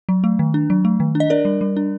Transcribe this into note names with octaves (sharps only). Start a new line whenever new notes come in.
F#3
A3
D#3
D4
F#3
A3
D#3
D4
D#5
D4 A#4 D5
G3
G3
D4